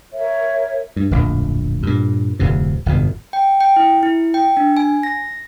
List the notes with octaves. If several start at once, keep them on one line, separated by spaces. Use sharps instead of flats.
A#4 C#5 E5
G2
D1 A#1 F2
G2 A#2
D1 F2 C3
G1 F2 B2
G5
G5
E4
E4
G5
D4
G#5
A#6